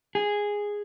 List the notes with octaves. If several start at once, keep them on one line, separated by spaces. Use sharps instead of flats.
G#4